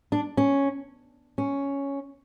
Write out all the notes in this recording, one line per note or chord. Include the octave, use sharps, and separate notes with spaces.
D4
C#4
C#4